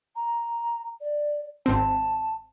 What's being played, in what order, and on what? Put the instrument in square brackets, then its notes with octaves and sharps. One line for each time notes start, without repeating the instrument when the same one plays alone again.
[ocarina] A#5
D5
[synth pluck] G#1 C4 [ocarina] A5